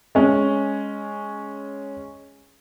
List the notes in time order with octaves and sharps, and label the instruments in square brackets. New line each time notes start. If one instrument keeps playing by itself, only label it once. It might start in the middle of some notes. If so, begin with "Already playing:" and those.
[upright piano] G#3 C#4